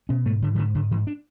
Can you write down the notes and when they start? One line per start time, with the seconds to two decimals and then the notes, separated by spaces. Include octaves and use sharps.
0.09 B2 C#4
0.25 G#2 A3
0.42 G#2 D3
0.55 E3
0.58 G#2 D3
0.75 G#2 D3
0.91 G#2 E3
1.07 D4